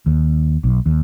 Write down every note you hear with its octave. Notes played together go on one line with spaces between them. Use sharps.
D#2
B1
D#2